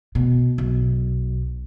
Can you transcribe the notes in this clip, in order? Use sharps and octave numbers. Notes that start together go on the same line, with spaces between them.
B2
B1